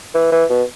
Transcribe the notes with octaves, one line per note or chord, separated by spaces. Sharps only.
E3
E3
B2